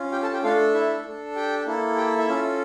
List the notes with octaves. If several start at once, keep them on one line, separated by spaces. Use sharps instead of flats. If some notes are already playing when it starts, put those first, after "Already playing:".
Already playing: C#4 F4
G4 G5
A4 A5
G4 G5
A3 D4 F4 A4 F5
E4 E5
D4 A4
G4 G5
A#3 E4 A4
G4 G5
E4 E5
C#4 F4 A4